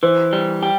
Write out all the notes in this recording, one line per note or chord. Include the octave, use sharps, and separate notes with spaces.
E3 C5
G3
G4